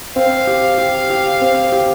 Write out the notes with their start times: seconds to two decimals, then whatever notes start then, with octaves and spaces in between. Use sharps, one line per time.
0.16 C4 F5
0.47 G4
0.78 G4
1.10 G4
1.41 C4
1.72 G4